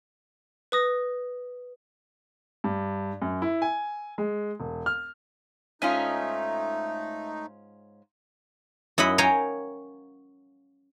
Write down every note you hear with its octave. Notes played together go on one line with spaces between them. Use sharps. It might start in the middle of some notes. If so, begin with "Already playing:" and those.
B4 D#6 A#6
G2
F#2
E4
G#5
G#3
E1
F6
G#2 A3 C#4 D#4 F4 D#5 E5
F#2 E4 D#5 F#5 B5
A#4 C#5 F5 G5 G#5 A#5